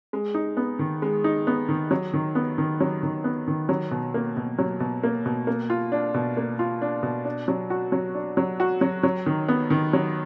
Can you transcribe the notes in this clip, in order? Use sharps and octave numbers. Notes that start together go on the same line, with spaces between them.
G#3
D#4
B3
D#3
G#3
D#4
B3
D#3
F#3
D#3
B3
D#3
F#3
D#3
B3
D#3
F#3
B2
A#3
B2
F#3
B2
A#3
B2
A#3
F4
D4
B2
A#3
F4
D4
B2
D4
F#3
F#4
F#3
D4
F#3
F#4
F#3
F#3
D#3
B3
D#3
F#3